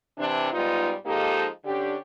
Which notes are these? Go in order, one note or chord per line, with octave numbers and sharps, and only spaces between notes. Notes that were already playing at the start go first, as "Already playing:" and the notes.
C3 E3 D4
G#2 G3 B3 D#4 F4
F3 G#3 A#3 D#4 G4 A4
D3 C#4 D4 G4